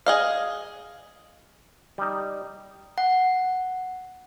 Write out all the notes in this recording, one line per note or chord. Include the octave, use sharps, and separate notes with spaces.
G#4 D#5 F5
G3 D#4
F#5